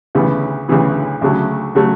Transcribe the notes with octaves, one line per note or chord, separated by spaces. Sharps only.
D2 C#3 E3 B3
D2 C#3 E3 B3
D2 C#3 F#3 A3
C#3 F#3 A3